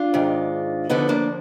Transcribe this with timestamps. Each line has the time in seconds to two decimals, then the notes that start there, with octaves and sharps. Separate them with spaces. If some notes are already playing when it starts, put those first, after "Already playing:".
Already playing: D4 F4
0.14 G#2 D#3
0.89 D2 D3 F3 B3 D#4
1.09 A#3 D4